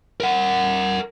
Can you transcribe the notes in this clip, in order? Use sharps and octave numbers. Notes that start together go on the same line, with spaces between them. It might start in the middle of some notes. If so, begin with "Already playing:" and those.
A#4 F#5